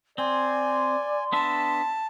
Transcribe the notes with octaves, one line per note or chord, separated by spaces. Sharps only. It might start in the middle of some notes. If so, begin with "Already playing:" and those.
C4 D5 G#5 C6
B3 D4 E5 A5